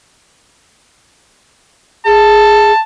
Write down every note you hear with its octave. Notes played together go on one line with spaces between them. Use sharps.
G#4 A5